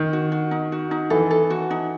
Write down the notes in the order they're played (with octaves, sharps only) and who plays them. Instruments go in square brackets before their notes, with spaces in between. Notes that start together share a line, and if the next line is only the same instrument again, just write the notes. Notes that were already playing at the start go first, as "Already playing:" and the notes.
Already playing: [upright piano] D#3 [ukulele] D#4
[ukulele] F#4
F#4
D#4
F#4
D#4
[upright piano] E3 [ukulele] A4
[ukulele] A4
F#4
D#4